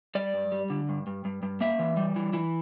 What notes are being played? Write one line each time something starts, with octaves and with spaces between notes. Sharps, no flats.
G3 D5
G2
G3
D3
G2
G2
G2
G2
A#3 E5
E3
G3
E3
E3